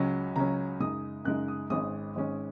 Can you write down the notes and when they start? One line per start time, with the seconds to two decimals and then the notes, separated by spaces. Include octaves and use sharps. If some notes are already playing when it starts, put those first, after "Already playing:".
Already playing: C#2 C#3 F#3 C#4
0.36 C#2 C#3 F#3 C#4 A#5
0.80 F#2 C#3 G#3 D#4 D#6
1.25 F#2 C#3 G#3 D#4 F#6
1.48 D#6
1.70 G#1 G#2 G#3 C#4 D#6
2.15 G#1 G#2 G#3 C#4